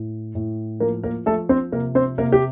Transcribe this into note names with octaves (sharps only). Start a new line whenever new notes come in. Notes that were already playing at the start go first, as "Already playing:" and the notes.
Already playing: A2
A2
F3 A#3 A#4
A#3 A#4
F3 A3 A4
C4 C5
C3 A#3 A#4
C4 C5
C3 A#3 A#4
G4